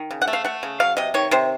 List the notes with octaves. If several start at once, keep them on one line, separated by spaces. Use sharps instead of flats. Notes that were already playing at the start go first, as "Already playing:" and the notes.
Already playing: D#3
C#3
F#5
A3
F5
A3 F#5
C#3
F#3 F5
C3 D#5
D#3 C#5
C3 C5